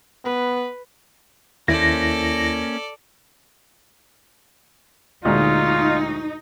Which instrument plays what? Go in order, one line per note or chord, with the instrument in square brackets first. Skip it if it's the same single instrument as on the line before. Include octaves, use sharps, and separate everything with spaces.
[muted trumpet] B3 [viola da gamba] B4
[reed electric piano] D#2 E4 [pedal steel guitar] A#3 C#4 C5 [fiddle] A4 D5 [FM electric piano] A#6
[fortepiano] D2 A#2 G#3 [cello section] D#4 [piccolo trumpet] F4